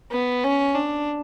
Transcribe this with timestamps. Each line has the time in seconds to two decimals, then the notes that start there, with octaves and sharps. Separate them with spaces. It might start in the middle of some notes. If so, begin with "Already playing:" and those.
0.11 B3
0.44 C#4
0.75 D4